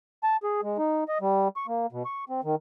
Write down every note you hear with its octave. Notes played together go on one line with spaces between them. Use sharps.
A5
G#4
G#3
D#4
D#5
G3
C#6
A#3
B2
C#6
C4
D#3